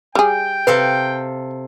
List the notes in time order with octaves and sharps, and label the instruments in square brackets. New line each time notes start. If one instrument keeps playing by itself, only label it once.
[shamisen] G3 G#4 [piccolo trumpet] G5
[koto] C3 A4 F5 [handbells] B4